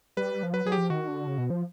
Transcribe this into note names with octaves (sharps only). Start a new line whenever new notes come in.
G3 B4
F3
F#3 B4
F#3 G#4
G4
F3
D#3 F#4
D3
C#3
B2
F3